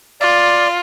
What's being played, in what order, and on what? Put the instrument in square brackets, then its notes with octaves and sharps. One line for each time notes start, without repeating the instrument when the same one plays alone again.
[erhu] F4 [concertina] D5